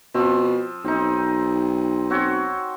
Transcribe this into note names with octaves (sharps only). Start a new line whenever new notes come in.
B2 F3 C4
B1 C4 D#4
C4 F#4 C#5